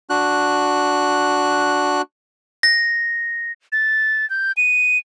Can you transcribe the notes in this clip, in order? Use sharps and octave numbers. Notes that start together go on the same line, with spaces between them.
D4 F#4 F#6
A#6
A6
G6
D#7